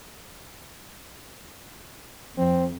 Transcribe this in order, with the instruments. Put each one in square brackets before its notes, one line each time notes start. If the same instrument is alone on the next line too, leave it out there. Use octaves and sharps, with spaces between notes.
[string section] F2 [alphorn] C4